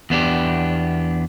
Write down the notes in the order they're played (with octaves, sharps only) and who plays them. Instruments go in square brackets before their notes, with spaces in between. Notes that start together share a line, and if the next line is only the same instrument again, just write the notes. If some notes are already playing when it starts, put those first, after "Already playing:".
[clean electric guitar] E2 B3 D4 G4